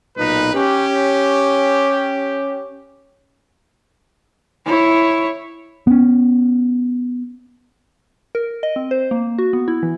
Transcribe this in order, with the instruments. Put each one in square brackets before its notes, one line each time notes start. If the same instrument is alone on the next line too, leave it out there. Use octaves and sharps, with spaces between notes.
[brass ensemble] B1 A#2 D#4 B4
C#4 G4
[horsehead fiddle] E4 C#5
[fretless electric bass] B3 C#4
[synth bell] A#4
D#5
C4
C5
A#3
F#4
B3
E4
E3